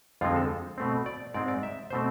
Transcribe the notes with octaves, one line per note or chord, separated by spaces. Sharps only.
F2 D3 F3 G#3 C4 F4
A4
B2 A3 C4
D5
G#2 G#3 C4 D5
D5
E5
B2 A3 C4 C5